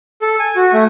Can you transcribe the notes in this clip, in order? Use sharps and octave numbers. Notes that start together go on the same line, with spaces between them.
A4
G#5
F#4
A3